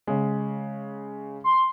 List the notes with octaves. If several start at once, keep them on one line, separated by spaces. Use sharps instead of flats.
C#3 G#3
C6